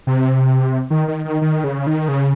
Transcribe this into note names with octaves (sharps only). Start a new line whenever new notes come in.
C3
D#3
D#3
D#3
D#3
C#3
D#3
C#3